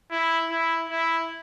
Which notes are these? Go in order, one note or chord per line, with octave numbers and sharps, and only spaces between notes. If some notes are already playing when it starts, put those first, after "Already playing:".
E4
E4
E4